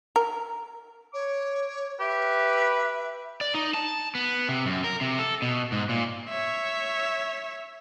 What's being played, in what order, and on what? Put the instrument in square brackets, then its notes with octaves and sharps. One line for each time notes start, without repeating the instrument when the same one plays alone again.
[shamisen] A#4
[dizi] C#5 [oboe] D6
[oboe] G4 [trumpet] B4 [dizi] E5
[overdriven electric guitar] D5
D#4
A5
B3
C3
F#2
A#4
C3
A4
B2
G#2
A#2
[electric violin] C#5 E5